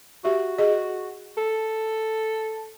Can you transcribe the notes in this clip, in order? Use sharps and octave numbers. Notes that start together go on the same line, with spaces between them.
F#4 G4 E5
G#4 D#5
A4